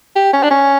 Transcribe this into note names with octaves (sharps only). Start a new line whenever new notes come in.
G4
C#4
D4
C#4